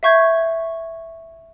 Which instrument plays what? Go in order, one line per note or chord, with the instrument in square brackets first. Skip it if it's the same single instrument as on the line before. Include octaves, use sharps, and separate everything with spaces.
[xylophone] E5 F5 C#6 G6 G#6